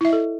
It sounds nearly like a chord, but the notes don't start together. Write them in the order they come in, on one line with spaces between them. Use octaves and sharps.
E4 E5 D#5 A4